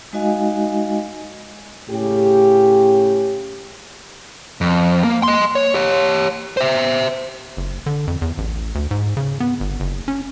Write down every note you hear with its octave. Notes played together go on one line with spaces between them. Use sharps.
G#3 D#4 F#4 D#5 F5 G#5
A2 C#3 C#4 G4
F2
A#3
D#5 C6
C#5
G4 C#5
C5 E5
F#1
D3
F2
E2
A1
D2
G#2
C#3
B3
G1
F#1
C#4